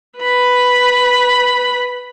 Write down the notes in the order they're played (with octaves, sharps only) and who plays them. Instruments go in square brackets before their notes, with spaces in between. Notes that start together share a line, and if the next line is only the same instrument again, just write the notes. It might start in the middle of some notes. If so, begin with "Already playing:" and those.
[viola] B4 B5